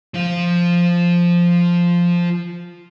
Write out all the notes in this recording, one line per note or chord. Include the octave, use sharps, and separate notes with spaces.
F3 F4